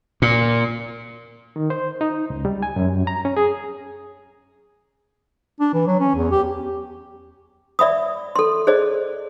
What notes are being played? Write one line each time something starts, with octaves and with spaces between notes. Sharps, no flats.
A#2
D#3
C5
D#4
C#2
G3
G#5
F#2
A#5
C#4
G#4
D4
E3
F#3
C#4
E2
G4
D5 E5 B5 D#6
A4 C6
G#4 C5 D5 D#5